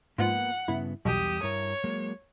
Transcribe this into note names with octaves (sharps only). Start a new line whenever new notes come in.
G#2 F3 A#3 B3 B4 F#5
G2 C#3 B3 E4
B1 E2 G3 G4 D#6
G2 E4 A#4 C#5
F#3 G#3 A#3